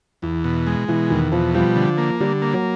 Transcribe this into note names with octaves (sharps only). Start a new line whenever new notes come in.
E2 E3
B2
G#3
B2 E3
E2 D#3
B2 F3
F3 G3
D3
A#3
D3 G3
A#3
F#3